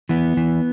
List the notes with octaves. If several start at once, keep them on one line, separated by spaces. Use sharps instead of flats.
E3 B3
E3